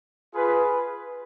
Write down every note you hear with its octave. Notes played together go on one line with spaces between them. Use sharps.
F4 G#4 B4